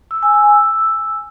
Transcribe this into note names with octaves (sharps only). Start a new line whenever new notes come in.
E6
G#5
E6